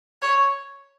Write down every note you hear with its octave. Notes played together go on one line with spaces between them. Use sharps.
C#5